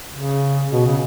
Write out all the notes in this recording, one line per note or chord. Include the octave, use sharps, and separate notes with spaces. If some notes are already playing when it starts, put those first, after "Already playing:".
C#3
B2
C#3